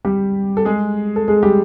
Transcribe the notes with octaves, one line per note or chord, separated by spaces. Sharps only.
G3 G4
A4
G#3 G#4
A4
G#3 G#4
G3 G4